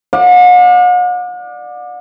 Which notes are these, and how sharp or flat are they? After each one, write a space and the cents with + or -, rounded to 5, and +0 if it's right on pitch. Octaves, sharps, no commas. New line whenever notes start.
D5 +20 F#5 -45